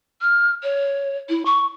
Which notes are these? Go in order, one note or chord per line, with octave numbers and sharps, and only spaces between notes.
F6
C#5
E4
C#6